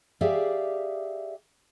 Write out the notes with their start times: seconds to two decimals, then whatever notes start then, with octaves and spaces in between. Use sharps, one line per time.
0.21 G4 G#4 D5 E5 F5